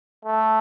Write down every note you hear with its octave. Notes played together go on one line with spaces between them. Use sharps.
A3